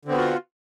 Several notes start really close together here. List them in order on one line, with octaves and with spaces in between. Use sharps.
D3 C4 B3 F#4 F4